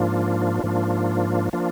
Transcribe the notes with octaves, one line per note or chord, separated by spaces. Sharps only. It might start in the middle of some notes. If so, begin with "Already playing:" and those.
Already playing: G#2 F3 A#3 D4 F4
G#2 F3 A#3 D4 F4
F3 A#3 D4 F4